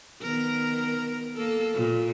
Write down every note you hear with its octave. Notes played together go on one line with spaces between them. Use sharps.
D#3 B3 A#4
A#3 A4
A#2